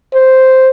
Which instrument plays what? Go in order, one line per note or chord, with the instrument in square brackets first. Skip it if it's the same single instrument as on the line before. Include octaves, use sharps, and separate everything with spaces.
[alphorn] C5